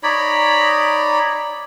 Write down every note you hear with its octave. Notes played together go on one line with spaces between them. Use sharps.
D#4 C#5 D5 B5